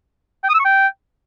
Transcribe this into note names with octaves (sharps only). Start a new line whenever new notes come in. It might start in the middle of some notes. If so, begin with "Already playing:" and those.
G5
D#6
E6
C#6
G5